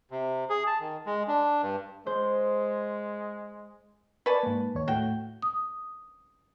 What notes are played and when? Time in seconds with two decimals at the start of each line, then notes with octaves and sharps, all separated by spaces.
0.11 C3
0.50 G#4
0.67 A5
0.80 D#3
1.06 G#3
1.28 D4
1.62 G2
2.07 G#3 C5
4.26 B4 D5 G#5 A5 C#6
4.43 G#2 A#3
4.75 D#2 C#5
4.88 A2 A3 F#4 G5
5.42 D#6